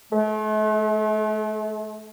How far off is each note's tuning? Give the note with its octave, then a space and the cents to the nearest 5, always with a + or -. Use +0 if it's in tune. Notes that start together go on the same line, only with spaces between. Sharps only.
A3 -40